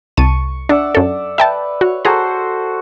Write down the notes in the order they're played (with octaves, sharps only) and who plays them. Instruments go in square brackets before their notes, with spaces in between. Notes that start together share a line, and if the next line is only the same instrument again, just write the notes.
[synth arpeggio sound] C2 A5 D#7 [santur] C#6
[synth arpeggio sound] D4 [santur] D5 E5 F#5
[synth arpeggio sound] F#2 A4
[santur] B4 [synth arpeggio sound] E5 G5 A5
[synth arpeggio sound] F#4 [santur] C#5
[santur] F#4 A4 C5 [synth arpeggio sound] G#4 A#5